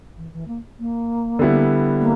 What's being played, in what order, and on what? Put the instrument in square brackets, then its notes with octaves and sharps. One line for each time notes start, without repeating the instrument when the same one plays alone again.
[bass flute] E3
E3
A#3
A#3
[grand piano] D3 G3 B3 E4
[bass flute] A#3